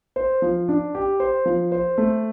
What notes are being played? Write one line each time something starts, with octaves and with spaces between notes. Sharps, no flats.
C5
F3
D4
G4
C5
F3
C5
A3